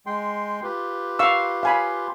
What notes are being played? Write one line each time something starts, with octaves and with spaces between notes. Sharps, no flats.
G#3 G5 C6
F4 G4 B4
F5 C#6 E6
F5 G#5 B5